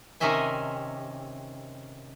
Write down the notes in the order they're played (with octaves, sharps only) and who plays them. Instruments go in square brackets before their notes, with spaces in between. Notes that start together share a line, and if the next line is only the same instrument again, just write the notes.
[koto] C3 D#3 C#4 D#5 E5 G#5